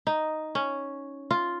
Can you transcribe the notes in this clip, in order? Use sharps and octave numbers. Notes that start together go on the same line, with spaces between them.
D#4
C#4
F4